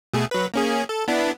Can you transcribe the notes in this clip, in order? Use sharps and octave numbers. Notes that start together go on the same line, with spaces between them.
B2 A3 G#4
F#3 B4
A#3 C#4 G#4
A4
B3 D4 E4